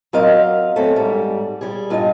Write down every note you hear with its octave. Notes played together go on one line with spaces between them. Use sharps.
F#3 C4 A#4 D#5 F5
A3 C4 C#4
G#2 G3
G3 G#4
G2 F4 D#5 F5